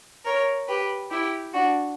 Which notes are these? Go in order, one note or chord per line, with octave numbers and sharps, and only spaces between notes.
A#4 C#5
G4 B4
E4 G4
D4 F#4